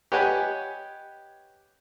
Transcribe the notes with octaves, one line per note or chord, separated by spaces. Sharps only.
G4 B4 C#5 D#5 F#5 G#5